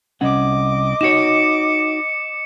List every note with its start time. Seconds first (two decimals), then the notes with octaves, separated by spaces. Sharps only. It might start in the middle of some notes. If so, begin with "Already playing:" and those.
0.21 C2 C#4 D#5 F#5 D6
1.01 D#4 F#4 C#5 C#7 E7